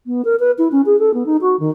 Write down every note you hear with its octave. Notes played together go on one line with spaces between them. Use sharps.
B3
A#4
B4
E4
C#4
G#4
A4
B3
D#4
F#4
D#3